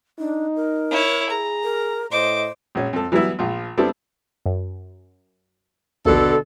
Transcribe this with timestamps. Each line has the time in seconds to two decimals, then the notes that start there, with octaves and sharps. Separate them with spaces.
0.19 D4 D#4
0.56 A#4
0.91 E4 C#5
1.30 G#4 A#5
1.64 A#4
2.11 A2 C5 D#5 D6
2.75 A#1 C#4
2.93 F2 A4
3.12 E3 F#3 G3 B3 E4
3.39 A#1 F3 F4
3.77 G3 B3 C4 D4 E4 A4
4.46 F#2
6.05 A#1 D#2 B2 D3 A4